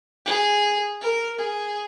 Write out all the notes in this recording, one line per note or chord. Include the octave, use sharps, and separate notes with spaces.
G#4
A#4
G#4